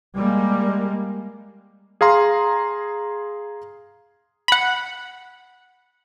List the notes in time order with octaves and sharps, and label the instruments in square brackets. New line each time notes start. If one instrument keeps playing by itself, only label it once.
[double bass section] G3 G#3 A#3
[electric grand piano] G#4 F5 A#5 C6
[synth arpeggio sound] F#5 B5